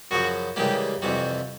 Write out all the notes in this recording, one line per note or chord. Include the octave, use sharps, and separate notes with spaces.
F#2 C#3 F3 F#4
C#2 C#3 E3 G3 A#3 G4
F2 C3 E3 G3 F#4